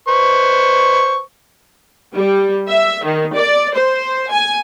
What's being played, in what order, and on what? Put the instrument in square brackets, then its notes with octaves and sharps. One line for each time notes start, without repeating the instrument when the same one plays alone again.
[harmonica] B4 C5 C#6
[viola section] G3
E5
D#3
D5
C5
G#5